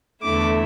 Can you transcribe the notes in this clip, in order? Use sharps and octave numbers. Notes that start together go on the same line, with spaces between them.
E2 D3 A3 E4 D6